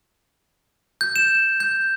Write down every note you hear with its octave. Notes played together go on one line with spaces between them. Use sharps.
G6
E7
G6